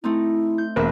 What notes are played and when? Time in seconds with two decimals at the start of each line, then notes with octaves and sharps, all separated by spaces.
0.04 A3 C4 D#4 E4
0.58 G6
0.76 E1 A#3 E5 F#6